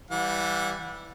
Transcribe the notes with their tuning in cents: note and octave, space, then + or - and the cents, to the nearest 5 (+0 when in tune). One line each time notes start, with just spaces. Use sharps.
E3 +0 G3 +0 F#5 -35